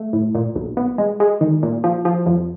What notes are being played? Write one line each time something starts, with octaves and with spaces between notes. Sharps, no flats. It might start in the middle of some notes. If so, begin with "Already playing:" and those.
Already playing: A3
A2
A#2
B1
B3
G#3
G#3
D#3
A#2
F3
F3
F2